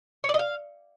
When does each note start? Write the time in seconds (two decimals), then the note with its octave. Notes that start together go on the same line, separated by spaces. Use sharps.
0.24 C#5
0.29 D5
0.34 D#5
0.39 F5